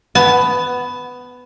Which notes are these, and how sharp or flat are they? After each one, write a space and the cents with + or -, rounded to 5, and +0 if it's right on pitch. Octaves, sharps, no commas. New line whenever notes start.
B3 +10 A5 -35